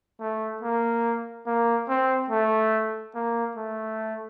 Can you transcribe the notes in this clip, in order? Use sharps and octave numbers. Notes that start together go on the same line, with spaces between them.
A3
A#3
A#3
C4
A3
A#3
A3